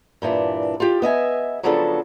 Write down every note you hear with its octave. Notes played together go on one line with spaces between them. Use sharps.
G2 A#2 E3 D4
F4 G4
B3 D#5 E5 G#5
C#3 F3 F#3 B3 D4 A4